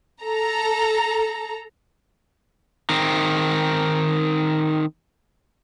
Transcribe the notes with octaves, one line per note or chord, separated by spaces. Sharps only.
A4 A#5
D#3 C4